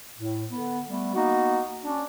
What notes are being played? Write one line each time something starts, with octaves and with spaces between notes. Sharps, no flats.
A2
D3 B3
G3 A3 B3
A#3 B3 D#4 F#4
C#4 D4